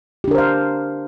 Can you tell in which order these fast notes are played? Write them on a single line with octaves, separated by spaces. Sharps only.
G4 D4 A#4 C5 F5